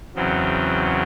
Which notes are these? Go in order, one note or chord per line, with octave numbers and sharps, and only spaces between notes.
E2 C#3 F#3 C4